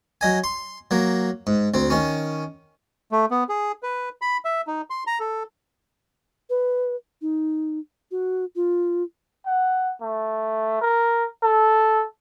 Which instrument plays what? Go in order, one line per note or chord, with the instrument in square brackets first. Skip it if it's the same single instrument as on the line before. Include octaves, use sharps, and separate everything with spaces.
[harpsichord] F#3 D#5 G#5
C6
F#3 A#3
G#2
D2 C4
D#3 C#4
[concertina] A3
B3
G#4
B4
B5
E5
D#4
C6
A#5
A4
[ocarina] B4
D#4
F#4
F4
[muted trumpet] F#5
A3
A#4
A4